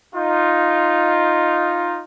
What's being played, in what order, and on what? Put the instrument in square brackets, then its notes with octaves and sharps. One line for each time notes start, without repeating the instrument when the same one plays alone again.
[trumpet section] D#4 F4